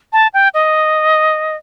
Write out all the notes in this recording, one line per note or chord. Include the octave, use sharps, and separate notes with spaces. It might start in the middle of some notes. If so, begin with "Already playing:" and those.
A5
G5
D#5